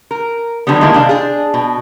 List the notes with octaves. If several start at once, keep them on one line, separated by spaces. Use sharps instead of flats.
A#4
D3 F#3 G3 B3
D#3 G3 G#3 A#3 E4
C3 C4 D4 F5
D4 G#4
B2